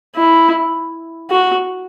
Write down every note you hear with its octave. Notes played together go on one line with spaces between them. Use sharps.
E4
F#4